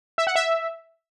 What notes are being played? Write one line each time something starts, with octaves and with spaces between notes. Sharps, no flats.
E5
F#5
E5